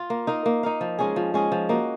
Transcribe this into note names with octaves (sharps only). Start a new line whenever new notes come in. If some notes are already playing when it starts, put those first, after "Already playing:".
Already playing: F4
A#3
D#4 A#4 F5
A#3
D#4 A#4 F5
F3
G#3 C#4 G#4
F3
G#3 C#4 G#4
F3
A#3 D#4 F#4